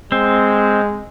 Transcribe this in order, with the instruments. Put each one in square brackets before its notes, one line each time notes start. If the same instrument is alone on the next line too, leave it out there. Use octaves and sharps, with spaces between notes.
[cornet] G#3 [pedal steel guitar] C4